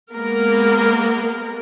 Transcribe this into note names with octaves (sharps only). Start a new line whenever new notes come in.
G#3 A#3 B3 A#4